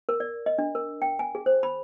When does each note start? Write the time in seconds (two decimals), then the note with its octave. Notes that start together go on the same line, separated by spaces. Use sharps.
0.09 A#4
0.20 D5
0.46 D#5
0.58 D4
0.75 A#4
1.02 G5
1.19 G#5
1.35 G#4
1.46 C5
1.63 B5